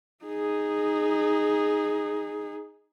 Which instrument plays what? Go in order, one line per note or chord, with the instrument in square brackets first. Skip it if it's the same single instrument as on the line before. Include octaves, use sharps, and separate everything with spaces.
[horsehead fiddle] D#4 G#4